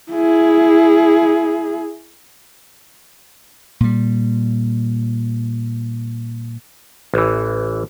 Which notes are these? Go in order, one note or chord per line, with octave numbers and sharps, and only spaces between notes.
E4 G#4
A#2 G3
A1 E3